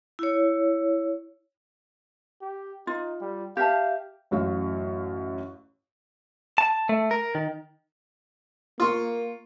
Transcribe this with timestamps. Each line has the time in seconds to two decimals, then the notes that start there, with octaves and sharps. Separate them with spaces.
0.19 E4 C#5
2.41 G4
2.87 D#4 F4
3.21 G3
3.57 G4 E5 F5 A5
4.31 A1 F#2 F#4 F5
6.58 A5
6.89 A3
7.11 A#4
7.35 D#3
8.80 A#3 F4 C6 C#6